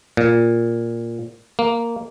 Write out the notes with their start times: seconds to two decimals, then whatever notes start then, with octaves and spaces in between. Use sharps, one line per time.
0.17 A#2
1.59 A#3